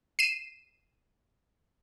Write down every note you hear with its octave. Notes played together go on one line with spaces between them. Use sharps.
C7 D#7 E7